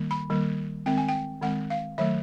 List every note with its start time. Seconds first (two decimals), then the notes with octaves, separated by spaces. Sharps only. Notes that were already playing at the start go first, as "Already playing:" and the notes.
Already playing: D#3 G3 A#3
0.11 B5
0.30 D#3 G3 A#3
0.86 D#3 G#3 C4 G5
0.98 G#5
1.09 G5
1.42 D#3 G#3 C4 F#5
1.70 F5
1.98 D#3 F#3 A3 E5